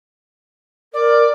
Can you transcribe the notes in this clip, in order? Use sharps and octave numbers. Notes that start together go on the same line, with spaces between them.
A#4 D5